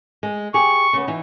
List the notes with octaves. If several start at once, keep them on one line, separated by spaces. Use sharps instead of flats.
G#3
G4 G#4 C#6
C#3 B3
E3 D#4